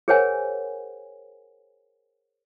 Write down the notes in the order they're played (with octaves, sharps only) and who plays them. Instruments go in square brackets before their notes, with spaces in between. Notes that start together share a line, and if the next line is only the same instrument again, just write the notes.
[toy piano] G#4 A#4 C5 C#5 F#5 G#5